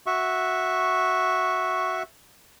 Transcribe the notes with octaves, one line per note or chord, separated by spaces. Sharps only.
F#4 E5 C#6